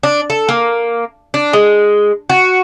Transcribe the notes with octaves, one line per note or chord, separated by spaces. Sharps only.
D4
A4
A#3
D4
G#3
F#4